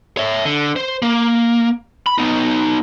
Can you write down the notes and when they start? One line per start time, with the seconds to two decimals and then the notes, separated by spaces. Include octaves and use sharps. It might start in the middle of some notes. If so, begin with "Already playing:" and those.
0.17 C#5 E5
0.45 D3
0.76 C5
1.02 A#3
2.07 B5
2.18 B3 D#4